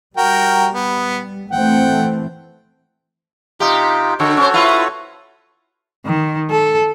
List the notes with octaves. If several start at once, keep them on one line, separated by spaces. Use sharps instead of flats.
G3 F#4 A#4 G5
B3
E3 A3 C4 F#5 G5
C3 D#4 F4 G4
D3 F#4 A4 C#5
C#4 C5
E4 F4 B4
D#3
A4